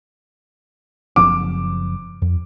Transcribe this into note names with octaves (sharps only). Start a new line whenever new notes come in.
F#1 F3 C4 D6
F2